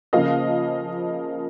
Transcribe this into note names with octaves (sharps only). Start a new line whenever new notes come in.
C#3 F3 A#3 D#5 F5